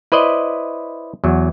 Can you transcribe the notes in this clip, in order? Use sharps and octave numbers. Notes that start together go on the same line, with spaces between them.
E4 B4 C5 D5 D#5
E2 F#3